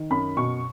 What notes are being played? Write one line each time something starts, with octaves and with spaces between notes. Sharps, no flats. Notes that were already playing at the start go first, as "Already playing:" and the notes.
Already playing: D#3
F#2 B5
B2 C#6